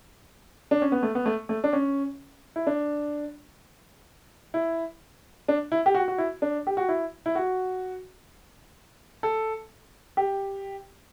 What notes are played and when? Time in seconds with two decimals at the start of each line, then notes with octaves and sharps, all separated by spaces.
0.71 D4
0.82 C#4
0.92 B3
1.03 A3
1.15 B3
1.26 A3
1.49 A3
1.64 D4
1.73 C#4
2.56 E4
2.67 D4
4.54 E4
5.48 D4
5.72 E4
5.86 G4
5.95 F#4
6.08 F#4
6.18 E4
6.42 D4
6.67 G4
6.77 F#4
6.89 E4
7.26 E4
7.35 F#4
9.23 A4
10.17 G4